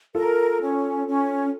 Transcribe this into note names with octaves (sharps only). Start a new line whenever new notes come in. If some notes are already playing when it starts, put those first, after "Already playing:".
F4 A4 A#4
C#4
C#4